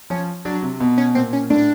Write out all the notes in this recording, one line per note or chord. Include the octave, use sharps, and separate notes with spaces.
F3 C#4
F#3 D4
C3
B2
C#4
A#2 C4
C#4
A2 D4